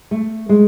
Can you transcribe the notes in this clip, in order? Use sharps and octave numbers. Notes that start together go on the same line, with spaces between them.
A3
G#3